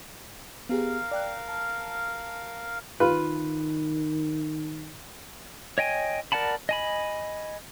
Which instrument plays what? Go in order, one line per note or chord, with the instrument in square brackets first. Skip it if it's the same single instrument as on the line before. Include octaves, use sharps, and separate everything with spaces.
[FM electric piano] B3 G4 G#4 [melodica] A#4 F5
[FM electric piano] D5 G5 F#6
A5
[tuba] D#3 [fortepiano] F4 B4
[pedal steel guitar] C#5 D#5 G5 G#5
A#4 D5 F#5 A5 B5
D#5 G#5 B5